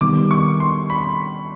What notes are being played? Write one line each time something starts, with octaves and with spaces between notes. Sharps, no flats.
D#3 G3 B3 D6
C#6
C6
B5